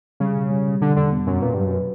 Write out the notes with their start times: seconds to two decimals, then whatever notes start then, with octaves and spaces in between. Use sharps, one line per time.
0.20 C#3 G3
0.35 B2
0.50 G3
0.66 G3
0.81 B2 D3
0.96 E2 D3
1.12 B3
1.27 F#2 B2
1.42 A#2 B4
1.54 G2 F#3
1.66 F#2
1.73 B4